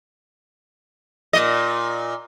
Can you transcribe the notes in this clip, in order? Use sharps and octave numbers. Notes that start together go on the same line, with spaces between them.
A#2 D#5